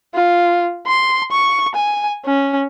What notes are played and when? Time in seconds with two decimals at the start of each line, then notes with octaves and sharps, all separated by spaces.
0.14 F4
0.86 C6
1.31 C#6
1.75 G#5
2.25 C#4